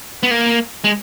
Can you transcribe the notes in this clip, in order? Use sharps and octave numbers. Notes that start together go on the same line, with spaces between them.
B3
A#3
G#3